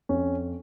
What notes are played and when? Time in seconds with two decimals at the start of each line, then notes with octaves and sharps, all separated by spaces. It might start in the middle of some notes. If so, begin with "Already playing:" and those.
0.09 F2 C#4